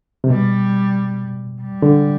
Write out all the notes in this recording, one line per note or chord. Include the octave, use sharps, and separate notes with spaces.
C3
B2 G3
G3
D3